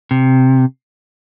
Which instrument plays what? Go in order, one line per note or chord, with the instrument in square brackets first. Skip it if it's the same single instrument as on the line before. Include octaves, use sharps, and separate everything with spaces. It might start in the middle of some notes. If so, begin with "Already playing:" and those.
[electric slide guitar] C3